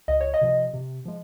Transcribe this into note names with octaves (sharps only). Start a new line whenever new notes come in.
C#2 D#5
C#5
D#5
C3 F3
C3
F3 G#3